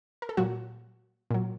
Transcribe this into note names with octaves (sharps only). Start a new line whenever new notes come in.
A#4
A4
A#2 F#3 F#4
A#2 F#3